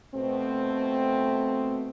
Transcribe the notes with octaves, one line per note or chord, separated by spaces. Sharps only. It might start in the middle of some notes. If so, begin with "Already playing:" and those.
B2 A3 C4